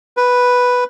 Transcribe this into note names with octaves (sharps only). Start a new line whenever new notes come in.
B4